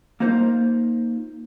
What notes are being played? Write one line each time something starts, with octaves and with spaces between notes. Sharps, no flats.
A#3 D#4 F4 C5 F5